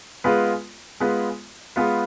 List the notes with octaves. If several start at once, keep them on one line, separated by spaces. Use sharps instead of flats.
G#3 B3 F4 B4
G#3 B3 F4 B4
G#3 B3 F4 B4